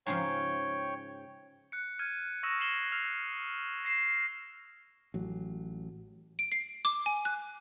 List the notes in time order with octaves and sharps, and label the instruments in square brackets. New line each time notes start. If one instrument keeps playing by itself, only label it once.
[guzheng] G#2 C#3 F3 [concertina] C#5 G5
[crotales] F#6 C#7
F6 G#6 D#7
C#6 D#6 E6 A#6 D#7 E7
A#6 C7 E7 F#7 G7
E6 F6 C7 F7
A#6 C7 E7
[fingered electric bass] A1 F#3
[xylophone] D7
C7
D6
G#5
F#6